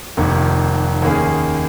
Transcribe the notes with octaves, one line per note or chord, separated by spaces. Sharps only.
F1 F2 C3 D#3 A#3
D#2 D#3 A#3 C#4 G#4